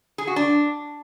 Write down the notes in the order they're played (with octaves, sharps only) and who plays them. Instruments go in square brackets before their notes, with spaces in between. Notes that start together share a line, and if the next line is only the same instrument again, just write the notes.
[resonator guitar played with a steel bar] G#4
F#4
D4